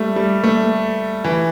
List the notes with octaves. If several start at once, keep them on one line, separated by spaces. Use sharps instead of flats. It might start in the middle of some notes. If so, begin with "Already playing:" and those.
Already playing: G3 A3
G3
A3
E3